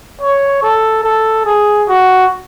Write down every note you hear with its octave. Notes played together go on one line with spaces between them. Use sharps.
C#5
A4
A4
G#4
F#4